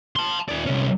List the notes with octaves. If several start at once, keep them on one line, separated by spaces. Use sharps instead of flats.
A5 C6
D#2 D5
C2 C#4